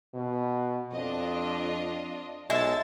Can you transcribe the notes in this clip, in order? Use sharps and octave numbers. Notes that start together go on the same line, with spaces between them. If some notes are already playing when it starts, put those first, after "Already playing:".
B2
F2 D4 F4 D#5
B1 G#3 E5 A5 E6 A6